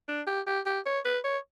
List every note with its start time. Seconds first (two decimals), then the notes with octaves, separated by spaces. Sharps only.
0.08 D4
0.27 G4
0.46 G4
0.66 G4
0.86 C#5
1.05 B4
1.24 C#5